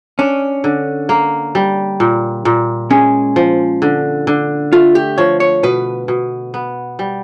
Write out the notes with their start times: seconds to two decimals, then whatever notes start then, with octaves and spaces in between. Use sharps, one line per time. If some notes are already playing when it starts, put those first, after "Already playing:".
0.19 C#4 D4
0.64 D3
1.09 A#3
1.55 G3
2.00 A#2
2.45 A#2
2.90 G#3 C#4
3.36 F3
3.82 D3
4.27 D3
4.73 A3 F4
4.95 G4
5.18 F3 C#5
5.40 C#5
5.63 B2 B4
6.08 B2
6.54 B3
6.99 G3